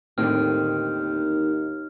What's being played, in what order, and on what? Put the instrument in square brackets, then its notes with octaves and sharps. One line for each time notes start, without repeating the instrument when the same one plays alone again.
[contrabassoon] D#2 [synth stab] A2 D3 [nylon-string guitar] D#3 C4 [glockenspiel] F6